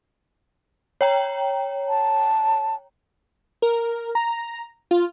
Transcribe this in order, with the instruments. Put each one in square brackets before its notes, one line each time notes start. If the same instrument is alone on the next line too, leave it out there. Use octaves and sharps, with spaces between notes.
[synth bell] C#5 G5 A#5
[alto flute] A5
[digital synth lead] A#4
A#5
F4